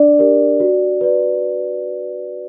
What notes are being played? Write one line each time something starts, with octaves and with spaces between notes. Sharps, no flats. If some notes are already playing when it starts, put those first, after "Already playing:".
Already playing: D4 D5
G4 A#4
F#4
B4 D5